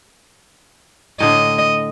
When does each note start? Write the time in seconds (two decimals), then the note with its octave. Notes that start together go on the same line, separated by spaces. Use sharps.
1.20 A2 D3 D#5 F5